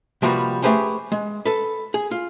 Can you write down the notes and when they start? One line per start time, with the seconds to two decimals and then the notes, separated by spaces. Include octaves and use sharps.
0.22 C3 F3 G3 A#3 F#4 B4
0.62 A3 G4 G#4 B4 C5 G5
1.12 G#3
1.45 A4 B4
1.94 G#4
2.11 F4